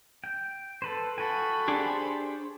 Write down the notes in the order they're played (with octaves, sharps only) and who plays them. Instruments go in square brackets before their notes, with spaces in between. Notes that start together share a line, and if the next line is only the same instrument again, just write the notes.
[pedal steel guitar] G5
A4 B4 C5
[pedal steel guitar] F#4 G5 G#5 [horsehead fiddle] A4 B5
[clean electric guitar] D4 G4 G#4 [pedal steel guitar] C5